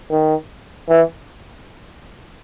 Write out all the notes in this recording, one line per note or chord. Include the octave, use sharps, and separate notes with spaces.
D#3
E3